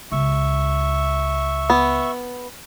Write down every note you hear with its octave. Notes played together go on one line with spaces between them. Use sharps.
C#2 E5 C#6
B3